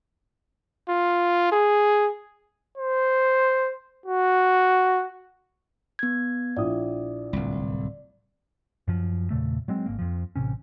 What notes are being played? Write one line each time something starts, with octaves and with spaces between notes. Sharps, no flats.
F4
G#4
C5
F#4
B3 G#6
A#1 E4 D5 D#6
D1 C2
F#2 F3
E2 A#2 C#3 A3
F#3 G#3 C4
G#1 A#3
F2 F3
A1 C3 C#4